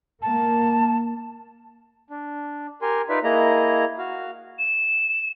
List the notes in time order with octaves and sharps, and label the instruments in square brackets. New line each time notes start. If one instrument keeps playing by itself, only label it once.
[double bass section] A#3 [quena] A5
[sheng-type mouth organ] D4
G4 A#4 G#5 C6
D#4 F4 B4 D5 E5
A#3 E4 G#4 D#5 A#5
F#4 F5
[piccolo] E7